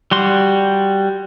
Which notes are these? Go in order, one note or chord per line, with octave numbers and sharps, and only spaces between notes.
G3 F#4 C6